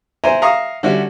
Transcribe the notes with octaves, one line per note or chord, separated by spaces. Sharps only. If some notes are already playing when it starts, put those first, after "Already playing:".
E4 C5 E5 G#5 A#5
E5 F5 A#5 C#6 D#6
D3 G3 C#4 E4 F#4